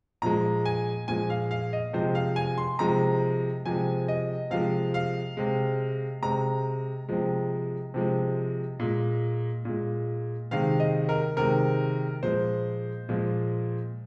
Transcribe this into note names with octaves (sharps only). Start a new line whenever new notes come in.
A#2 F3 G#3 A#5
G#5
A#2 F3 G#3 G#5
F5
F5
D#5
C3 F3 G#3 C5
F5
G#5
C6
C3 F3 G#3 A#5
C3 F3 G#3 G#5
D#5
C3 F3 G#3 F5
F5
C3 G#3
C3 G#3 A#5
C3 F3 G#3
C3 F3 G#3
A#2 G#3
A#2 G#3
C3 D#3 G#3 F5
D#5
A#4
C3 D#3 G#3 A#4
A#2 F3 G#3 C5
A#2 F3 G#3